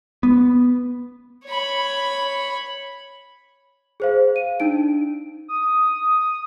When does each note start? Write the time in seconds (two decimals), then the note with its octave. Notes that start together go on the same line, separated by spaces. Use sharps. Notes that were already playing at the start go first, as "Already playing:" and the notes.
0.23 B3
1.47 C#5 B5
4.00 G#4 C5 F5
4.36 D#7
4.60 D4 D#4 D7
5.48 D#6